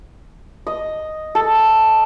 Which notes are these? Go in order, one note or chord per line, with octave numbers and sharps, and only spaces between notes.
D#5
A4